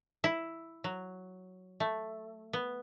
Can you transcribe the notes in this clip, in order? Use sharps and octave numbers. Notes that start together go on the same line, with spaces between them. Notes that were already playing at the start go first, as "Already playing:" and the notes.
E4
F#3
A3
B3